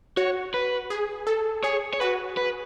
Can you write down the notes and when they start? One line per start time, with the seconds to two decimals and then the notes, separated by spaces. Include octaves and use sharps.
0.17 F#4 C#5
0.54 B4
0.90 G#4
1.27 A4
1.63 G#4 C#5
1.93 C#5
2.00 F#4 B4
2.37 B4